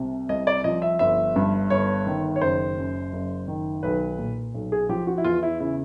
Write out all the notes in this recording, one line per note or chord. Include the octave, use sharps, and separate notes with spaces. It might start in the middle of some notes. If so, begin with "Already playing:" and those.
Already playing: C2 C3
C2 D#5
D5
F3 D#5
E5
G1 E5
G2
G1 C#5
D#3
C#5
F#1 C5
F#2
F#1
D#3
B1 B4
A#2
B1
G#4
F3 G4
F#4
E4
E2 F4
E4
C#3 E4